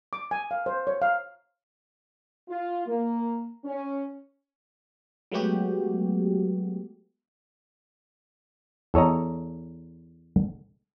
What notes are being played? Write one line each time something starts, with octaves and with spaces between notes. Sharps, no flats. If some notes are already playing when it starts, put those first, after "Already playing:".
D6
G#5
F5
C5
C#5
F5
F4
A#3
C#4
F#3 G#3 A3 B3 F#4 G4
E2 A4 C#5 D#5 A#5